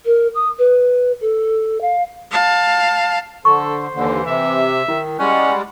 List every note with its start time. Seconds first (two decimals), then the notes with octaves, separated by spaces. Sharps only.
0.05 A#4
0.35 D#6
0.58 B4
1.21 A4
1.81 F5
2.31 F5 A5
3.45 D3 A4 C5 C#6
3.94 D#2 D3 E3
4.26 C3 E5
4.88 D#3 E4
5.19 G3 G#3 C#4 F#5